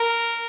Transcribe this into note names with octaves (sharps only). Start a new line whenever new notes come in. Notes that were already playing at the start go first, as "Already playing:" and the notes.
Already playing: A#4